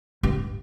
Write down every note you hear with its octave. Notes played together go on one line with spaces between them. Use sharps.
G2